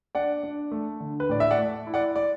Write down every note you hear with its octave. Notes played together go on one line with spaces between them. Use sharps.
D4 D5 F#5
D4
A3
D3
B4
A2 D5
E5
D5 F#5
A3
E4
D5 F#5
D5